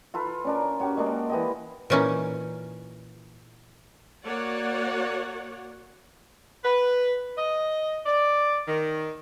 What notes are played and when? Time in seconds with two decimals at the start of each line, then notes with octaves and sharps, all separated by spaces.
0.14 F4 A4 B4
0.45 C#4 D4 A#4
0.80 C#4 F#4 G4
0.97 G#3 A#3 D4
1.30 E3 G4 D#5
1.90 A#2 E3 C#4 D#4 E4
4.25 A#3 F#4 C#5 D5 F#5
6.64 B4
7.37 D#5
8.06 D5
8.67 D#3